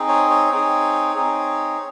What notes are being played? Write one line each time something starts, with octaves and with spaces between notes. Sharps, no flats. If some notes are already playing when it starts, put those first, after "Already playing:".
Already playing: C4 D#4 G#4
C#5
C#5
C4 D#4 G#4
C4 D#4 G#4